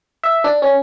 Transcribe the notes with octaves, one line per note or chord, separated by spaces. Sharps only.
E5
D4
C#4